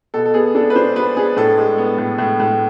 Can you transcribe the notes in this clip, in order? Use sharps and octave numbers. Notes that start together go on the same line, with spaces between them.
B2 A4
A4
B3 G#4
D4 A4
B4
D4 C5
B3 B4
D4 G#4
A2 A4
G#3
B3
A2
A2
A2